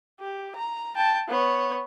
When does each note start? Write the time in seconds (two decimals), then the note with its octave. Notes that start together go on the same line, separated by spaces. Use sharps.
0.20 G4
0.55 A#5
0.96 G5 A5
1.29 B3 C#5